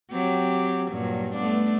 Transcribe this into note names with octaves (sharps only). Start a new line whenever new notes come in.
F#3 C4 G4
G2 A#2 F#3
A3 B3 D4